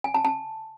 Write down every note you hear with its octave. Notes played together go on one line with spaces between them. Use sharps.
G#5
A5
A5